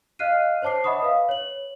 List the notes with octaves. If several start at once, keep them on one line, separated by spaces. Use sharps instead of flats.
D#5 F5 F6 F#6 C7 D#7
C5 C#5 A5 D6 C7
D#5 E5 F#5 B5 C#6 D#6
B4 F5
C#5 F#7